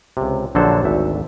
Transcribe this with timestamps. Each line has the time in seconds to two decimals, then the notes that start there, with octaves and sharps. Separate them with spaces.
0.17 C#2 C3
0.55 A#1 D3 F#3 A4 C5 A5
0.83 G#1 D2 E5